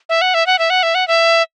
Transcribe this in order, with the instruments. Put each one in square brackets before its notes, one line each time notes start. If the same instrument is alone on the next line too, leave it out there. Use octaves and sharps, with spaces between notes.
[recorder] E5
F#5
E5
F#5
E5
F#5
E5
F#5
E5